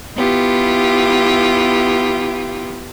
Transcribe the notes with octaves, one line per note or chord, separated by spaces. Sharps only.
B3 E4 F4 G4